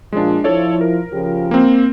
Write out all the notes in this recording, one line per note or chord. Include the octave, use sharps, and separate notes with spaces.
A#2 F3 G#3 D4
F3 E4 A4 C#5 D5
A#4
C#3 F3 G4
A#3 C4